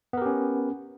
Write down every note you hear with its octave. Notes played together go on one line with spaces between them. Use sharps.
B3 C#4 G4 A#4